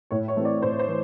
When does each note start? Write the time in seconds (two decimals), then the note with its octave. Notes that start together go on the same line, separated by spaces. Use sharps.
0.11 A2 C#5
0.28 C#5
0.37 E3 A3 C4
0.45 D5
0.62 A2 C5
0.79 C5
0.88 E3